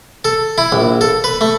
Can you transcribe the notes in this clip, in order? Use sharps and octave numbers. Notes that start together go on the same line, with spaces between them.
A4
E4
A#1
A4
B4
A3